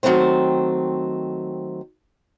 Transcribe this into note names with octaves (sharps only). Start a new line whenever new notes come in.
D#3 F#3 A3 C4 C5